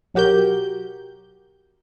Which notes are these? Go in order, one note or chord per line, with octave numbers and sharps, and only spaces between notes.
B1 F#3 F#4 G4 A#4 G6